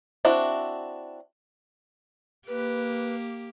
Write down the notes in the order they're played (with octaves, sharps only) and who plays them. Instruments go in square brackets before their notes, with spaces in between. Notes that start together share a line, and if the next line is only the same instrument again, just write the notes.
[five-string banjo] C4 D4 E4 F#4
[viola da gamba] A#3 G4 [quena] B4